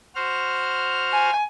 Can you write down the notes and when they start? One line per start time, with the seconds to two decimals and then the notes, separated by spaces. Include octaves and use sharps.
0.15 F#4 C5 F6
1.13 G#5